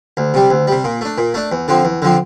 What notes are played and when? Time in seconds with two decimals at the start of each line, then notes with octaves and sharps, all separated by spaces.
0.17 D2
0.34 C3 G3
0.50 D2
0.67 C3 G3
0.84 A#2
1.01 A3 D4
1.18 A#2
1.34 A3 D4
1.52 E2
1.68 D3 F3 C4
1.85 E2
2.02 D3 F3 C4